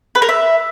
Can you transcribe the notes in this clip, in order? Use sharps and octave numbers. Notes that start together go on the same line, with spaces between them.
B4
A#4
E5